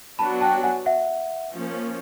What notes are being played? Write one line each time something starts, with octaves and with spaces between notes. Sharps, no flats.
F#3 B3 D4 F#4 A5 B5
G5 A5
F#5 G#5
E5 F#5
F3 A#3 C#4